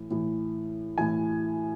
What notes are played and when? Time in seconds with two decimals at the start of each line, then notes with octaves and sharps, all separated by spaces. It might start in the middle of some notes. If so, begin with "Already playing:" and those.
Already playing: A2 E3
0.11 A2 E3
0.98 A2 E3 G#5